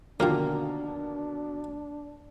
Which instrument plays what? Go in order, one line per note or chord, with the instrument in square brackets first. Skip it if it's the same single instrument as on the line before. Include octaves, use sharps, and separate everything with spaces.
[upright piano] B2 D3 D#3 [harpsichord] F3 F4 G4 [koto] A#3 [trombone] D4